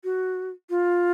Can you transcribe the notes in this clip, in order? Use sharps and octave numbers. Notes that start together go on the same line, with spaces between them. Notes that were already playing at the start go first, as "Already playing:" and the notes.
F#4
F4